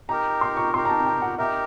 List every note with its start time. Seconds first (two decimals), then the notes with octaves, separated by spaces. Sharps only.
0.09 D#4 G4 A#4 A#5
0.41 C6
0.57 C#6
0.73 D#4 G4 A#4 C6
0.85 A#5
0.89 A5
1.06 G5
1.22 F#5
1.38 D#4 G4 A#4 E5